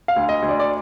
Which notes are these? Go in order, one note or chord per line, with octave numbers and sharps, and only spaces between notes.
F5
D2
D#5
D2
D5
D5